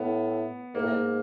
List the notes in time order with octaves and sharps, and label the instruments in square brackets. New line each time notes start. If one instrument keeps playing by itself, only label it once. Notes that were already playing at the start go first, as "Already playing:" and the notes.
Already playing: [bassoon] A2 [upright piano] B3
[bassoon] G#2 [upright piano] A#3
[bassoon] A2
G#2